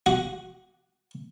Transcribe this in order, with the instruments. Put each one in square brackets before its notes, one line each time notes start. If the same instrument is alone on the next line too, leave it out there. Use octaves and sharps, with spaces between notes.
[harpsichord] F#4